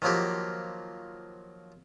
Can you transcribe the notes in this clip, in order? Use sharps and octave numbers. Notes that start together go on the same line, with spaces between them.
D#3 F3 F#3 A#3 G4